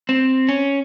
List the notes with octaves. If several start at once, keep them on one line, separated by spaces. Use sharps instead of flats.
C4
C#4